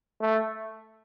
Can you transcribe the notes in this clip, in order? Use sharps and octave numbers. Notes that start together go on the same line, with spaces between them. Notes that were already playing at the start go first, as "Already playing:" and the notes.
A3